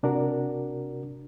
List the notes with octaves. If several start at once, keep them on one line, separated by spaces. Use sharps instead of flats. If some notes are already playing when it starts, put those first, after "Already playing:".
C3 D4 F#4 A#4